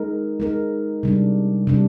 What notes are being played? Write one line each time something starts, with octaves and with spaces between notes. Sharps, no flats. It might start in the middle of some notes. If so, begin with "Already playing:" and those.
Already playing: G#3 D#4 A#4
G#3 D#4 A#4
C3 G3 D4
C3 G3 D4